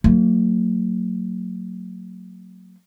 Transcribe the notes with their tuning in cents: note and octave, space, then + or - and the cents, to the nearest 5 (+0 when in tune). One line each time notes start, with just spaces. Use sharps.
F#3 +0 A#3 -40